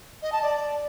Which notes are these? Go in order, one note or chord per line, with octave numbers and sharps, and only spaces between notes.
D#5
A5
D5